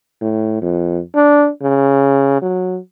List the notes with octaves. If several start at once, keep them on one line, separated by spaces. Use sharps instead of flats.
A2
F2
D4
C#3
F#3